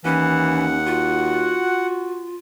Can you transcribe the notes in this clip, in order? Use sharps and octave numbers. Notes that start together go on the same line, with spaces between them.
D#2 E3 C#4 F#5
F4 F#4